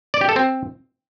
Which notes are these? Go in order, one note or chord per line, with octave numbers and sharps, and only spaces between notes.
D5
G4
A4
C4